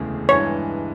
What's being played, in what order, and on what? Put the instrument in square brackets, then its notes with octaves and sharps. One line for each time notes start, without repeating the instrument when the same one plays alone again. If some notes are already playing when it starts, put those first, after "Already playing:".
Already playing: [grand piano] E1 D2 C#3 E3
[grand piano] G2 E3 G#3 [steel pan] C#5